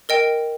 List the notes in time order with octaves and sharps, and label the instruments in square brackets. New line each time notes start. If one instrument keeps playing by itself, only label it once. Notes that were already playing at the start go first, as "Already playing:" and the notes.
[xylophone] A#4 D#5 G5